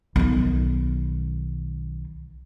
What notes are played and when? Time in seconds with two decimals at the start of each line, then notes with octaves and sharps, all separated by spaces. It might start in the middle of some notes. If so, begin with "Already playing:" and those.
0.16 B1 D#3